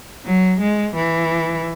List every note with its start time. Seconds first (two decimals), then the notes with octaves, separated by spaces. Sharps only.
0.25 F#3
0.60 G#3
0.95 E3